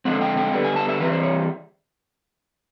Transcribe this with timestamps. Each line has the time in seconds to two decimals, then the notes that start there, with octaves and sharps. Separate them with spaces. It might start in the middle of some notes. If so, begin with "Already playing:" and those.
0.05 D3 F3 G#3 C4 F#5
0.21 G5
0.37 G5
0.53 D3 G3 B3
0.64 G#5
0.76 A5
0.89 E5
1.00 E3 G3 C4 B4
1.12 C5
1.23 C#5